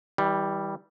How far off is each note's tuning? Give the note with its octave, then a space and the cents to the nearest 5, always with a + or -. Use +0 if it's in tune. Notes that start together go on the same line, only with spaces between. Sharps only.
E3 -35 G3 +0